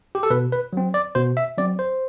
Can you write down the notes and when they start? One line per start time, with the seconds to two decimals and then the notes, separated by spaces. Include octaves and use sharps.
0.15 G4
0.23 A4
0.30 B2 B4
0.52 B4
0.73 F#3 C4
0.94 D5
1.15 B2 C5
1.37 E5
1.57 F#3 C4 D5
1.79 C5